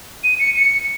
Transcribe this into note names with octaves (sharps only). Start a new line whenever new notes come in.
D#7
C#7
C#7